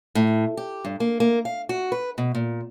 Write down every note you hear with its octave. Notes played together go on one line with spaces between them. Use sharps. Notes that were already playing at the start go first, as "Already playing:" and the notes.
A2
G4
G2
A#3
A#3
F5
F#4
B4
B2
A#2